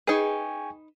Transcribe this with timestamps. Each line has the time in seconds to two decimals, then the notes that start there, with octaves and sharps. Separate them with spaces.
0.07 D#4 G#4 B4 G5 G#5 C#6